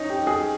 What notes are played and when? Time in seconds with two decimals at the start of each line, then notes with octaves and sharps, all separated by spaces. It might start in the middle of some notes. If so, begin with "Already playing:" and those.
Already playing: C#4 D#4
0.10 G4
0.27 G#4